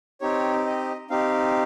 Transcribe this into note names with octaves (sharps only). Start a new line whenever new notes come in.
C4 D#4 G4 C#5
D#5
C4 D#4 G4 F5